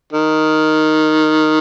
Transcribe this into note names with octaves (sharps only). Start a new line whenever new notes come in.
D#3